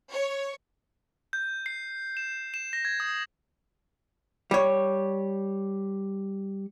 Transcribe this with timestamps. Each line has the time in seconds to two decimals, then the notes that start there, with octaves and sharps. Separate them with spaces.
0.11 C#5
1.33 G6
1.66 C7
2.17 E7
2.54 E7
2.73 A#6
2.85 G#6
3.00 D#6
4.51 G3 C#5